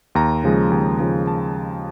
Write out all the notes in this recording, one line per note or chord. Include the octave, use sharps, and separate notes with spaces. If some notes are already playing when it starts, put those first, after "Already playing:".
D#2 A#5
C#3 F3 G#3
D#2
C#3 F3 G#3
A5